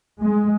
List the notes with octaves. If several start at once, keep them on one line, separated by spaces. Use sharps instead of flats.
G#3